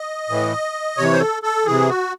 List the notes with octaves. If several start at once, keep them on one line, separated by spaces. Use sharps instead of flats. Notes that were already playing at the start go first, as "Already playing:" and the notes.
Already playing: D#5
A2 E3
C3 E3 C#5
C5
A4
A4
C3 E3 G#4
F#4